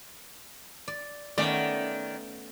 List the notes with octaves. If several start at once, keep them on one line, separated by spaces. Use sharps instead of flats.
D5
D#3 A3 B3 C#4 D5